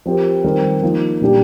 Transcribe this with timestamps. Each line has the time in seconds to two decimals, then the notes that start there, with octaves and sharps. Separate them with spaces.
0.06 F3 C4 G4 A#4
0.44 D#3 G3 C4 G4 A#4
0.83 F3 A#3 D#4
1.21 A#2 G3 D4 G4